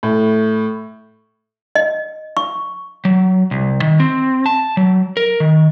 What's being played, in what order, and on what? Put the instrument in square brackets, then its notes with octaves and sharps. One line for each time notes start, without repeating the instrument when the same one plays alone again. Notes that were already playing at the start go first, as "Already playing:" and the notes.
[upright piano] A2
[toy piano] D#5
C#6
[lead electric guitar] F#3
C2
D#3
C4
A5
F#3
A#4
D#3